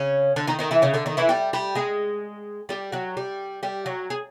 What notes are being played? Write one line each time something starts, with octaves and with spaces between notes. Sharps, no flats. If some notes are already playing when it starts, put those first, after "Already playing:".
Already playing: C#3 C#4
D3 D4
D#3 D#4
D#3 D#4
E3 E4
C#3 C#4
D3 D4
D#3 D#4
E3 E4
G3 G4
G3 G4
G#3 G#4
G3 G4
F#3 F#4
G3 G4
G3 G4
F#3 F#4
G#4